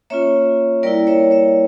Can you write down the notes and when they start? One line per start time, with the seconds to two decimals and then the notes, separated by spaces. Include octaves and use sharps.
0.10 A#3 C#4 F4 C#5 E5
0.83 G3 A#3 E4 A#4 D5
1.07 C#5 E5
1.31 C#5 E5